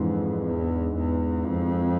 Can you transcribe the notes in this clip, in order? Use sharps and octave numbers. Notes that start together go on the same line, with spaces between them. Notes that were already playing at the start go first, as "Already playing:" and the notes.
Already playing: F2 G#2 E3 G#3 D4
E2
E2
F2